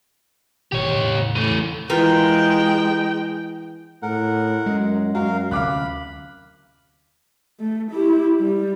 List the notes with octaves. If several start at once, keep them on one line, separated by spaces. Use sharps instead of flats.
G1 B2 D#3 G4 C#5
E2 A2 C#3
E3 A3
E3 G#3 F4 A#4 G5
A2 A#4 F#5
F#2 G#3
F#2 F#4 A#4 F5
D2 C3 F5 B5 D6 F#6
A3
E4 G4
G3